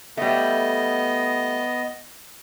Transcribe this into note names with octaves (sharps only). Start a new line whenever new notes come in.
G3 A3 B3 D#5